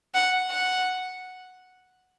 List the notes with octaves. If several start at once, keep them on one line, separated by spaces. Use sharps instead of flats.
F#5
F#5